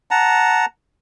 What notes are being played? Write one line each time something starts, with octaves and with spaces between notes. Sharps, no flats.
F#5 A5 A#5